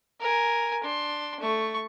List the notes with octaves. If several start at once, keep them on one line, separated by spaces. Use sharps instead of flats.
A#4 G#5
D4 C6
A3 C#6